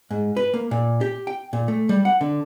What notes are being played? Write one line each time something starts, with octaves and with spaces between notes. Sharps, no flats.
G#2
B4
A#3
A#2
G4
G5
A#2
A3
G3
F#5
D3